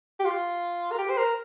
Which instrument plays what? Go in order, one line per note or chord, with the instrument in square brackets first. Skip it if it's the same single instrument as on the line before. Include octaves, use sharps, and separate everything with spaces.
[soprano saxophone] G4
F4
A#4
G4
C5
A#4